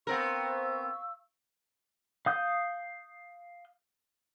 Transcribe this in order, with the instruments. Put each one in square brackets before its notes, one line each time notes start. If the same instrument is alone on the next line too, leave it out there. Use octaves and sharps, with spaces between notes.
[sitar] B3 C4 A#4 [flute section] F5 C#6 E6
[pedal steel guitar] F5 D#6 G6